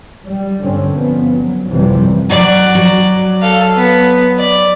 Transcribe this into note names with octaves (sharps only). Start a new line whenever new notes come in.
G3
G2 A#2 D3 C4 C#4
G2 F3 B3
F#3
A1 F#2 C3 E3 F3 G3
F#3 F#4 D5
F#3
A4 F5
B3
D5